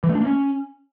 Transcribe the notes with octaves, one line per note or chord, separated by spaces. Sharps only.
E3
A3
D4
A#3
C#4